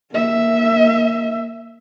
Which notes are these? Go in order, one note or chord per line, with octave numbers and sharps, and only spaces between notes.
A#3 E5